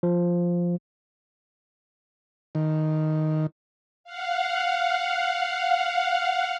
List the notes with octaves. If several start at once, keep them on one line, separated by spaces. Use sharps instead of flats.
F3
D#3
F5 F#5